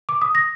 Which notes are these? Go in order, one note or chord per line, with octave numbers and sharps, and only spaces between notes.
D6
D#6
A#6